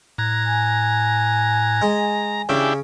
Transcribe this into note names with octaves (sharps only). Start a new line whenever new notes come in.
A2 A#5 F#6 G#6
G#5
G#3
C#3 D4 E4 G4